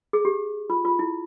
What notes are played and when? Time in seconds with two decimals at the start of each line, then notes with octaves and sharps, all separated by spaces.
0.13 G#4
0.25 G4
0.70 F4
0.85 F4
0.99 E4